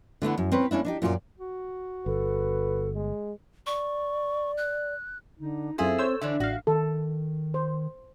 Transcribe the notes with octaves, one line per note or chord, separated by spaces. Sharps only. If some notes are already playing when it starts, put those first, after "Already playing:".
D3 A3 B3 E4
F#2
C4 C#4 B4 C#5
A#3 C#4 D4 E4
D4 D#4 G4
F#2 A#2 F4 G4 D5
F#4
G1 A4 B4
G#3
D5 C#6
F#6
D3 D#4
F#2 C4 E4 F4 G#4 A4
C5 C#5 E6
D3 E3 D4 D5 E5
A1 F#4 F5
D#3 A4
C5